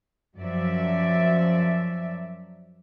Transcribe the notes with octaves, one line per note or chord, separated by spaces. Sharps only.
F#2 F3 F#3 D5 E5